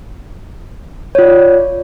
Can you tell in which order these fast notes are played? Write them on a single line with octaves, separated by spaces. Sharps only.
C#5 F4 D5